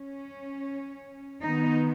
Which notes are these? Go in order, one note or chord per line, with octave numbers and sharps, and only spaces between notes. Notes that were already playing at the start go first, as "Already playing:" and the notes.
Already playing: C#4
D#3 B3 D#4